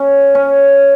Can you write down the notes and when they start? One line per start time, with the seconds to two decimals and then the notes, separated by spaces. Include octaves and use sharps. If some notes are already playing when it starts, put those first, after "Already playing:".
Already playing: C#4
0.35 C#4